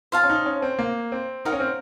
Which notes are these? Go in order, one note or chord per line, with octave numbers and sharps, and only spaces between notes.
F4 C5 F5 A5
C#4
D#4
C#4
C4
A#3
C4
D#4 F#4 A#4 F5
C#4
C4